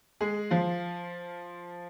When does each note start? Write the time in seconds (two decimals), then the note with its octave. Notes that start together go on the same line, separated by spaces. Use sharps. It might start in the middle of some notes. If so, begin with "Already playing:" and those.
0.21 G#3 G#4
0.50 F3 F4